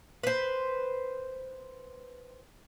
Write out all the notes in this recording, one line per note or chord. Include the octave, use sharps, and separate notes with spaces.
B4 C5